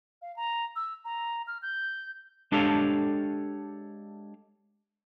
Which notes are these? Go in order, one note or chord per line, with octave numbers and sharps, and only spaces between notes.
F5
A#5
E6
A#5
F6
G6
G#3 D4 G4 A4 C#5 F5